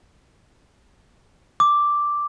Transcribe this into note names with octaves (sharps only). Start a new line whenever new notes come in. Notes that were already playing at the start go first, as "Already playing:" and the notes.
D6